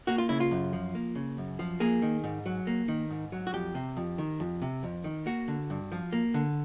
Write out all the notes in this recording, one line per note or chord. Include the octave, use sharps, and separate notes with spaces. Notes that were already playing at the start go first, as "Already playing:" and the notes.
A#3 F#4
F4
C#3 E4
F4
F#2
F3
A#3
C#3
F#2
F3
A#3 G#4
D#3
G#2
F#3
A#3
D#3
G#2
F#3
F#4
F2 G4
C3
F2
D#3
F2
C3
F2
D#3
A#3 F#4
D3
G2
F3
A#3
D3